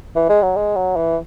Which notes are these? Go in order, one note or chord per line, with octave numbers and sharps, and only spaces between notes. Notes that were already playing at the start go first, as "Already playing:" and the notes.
E3
G#3
F#3
G#3
F#3
E3